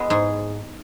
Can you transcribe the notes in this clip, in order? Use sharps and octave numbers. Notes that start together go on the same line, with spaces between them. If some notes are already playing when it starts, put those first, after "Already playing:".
Already playing: G#3 B3 E4
G#2 G#4